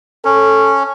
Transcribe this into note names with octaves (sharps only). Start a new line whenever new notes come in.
C#4 A4